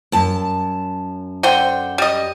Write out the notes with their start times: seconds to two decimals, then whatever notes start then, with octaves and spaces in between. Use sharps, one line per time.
0.12 F#2 A5
1.43 D3 C5 G5
1.98 G3 D#5